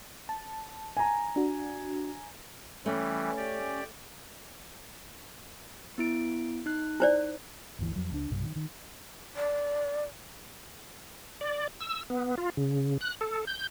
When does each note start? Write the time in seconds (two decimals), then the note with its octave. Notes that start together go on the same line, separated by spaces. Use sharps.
0.29 A5
0.97 G#5 A#5
1.36 D4 F#4
2.86 E3 G3 A3 C#4
3.37 G4 D5
5.98 B3 E4 D7
6.66 D#4 F#6
7.00 E4 C5 D5
7.79 G1 D2 E3
7.96 F2 F#3
8.12 C#2 D4
8.30 B1 G2 C3
8.44 D#3
8.56 D#3
9.36 D5
11.41 D5
11.80 E6
12.10 B3
12.38 F4
12.57 C#3
13.01 F#6
13.21 A4
13.47 G6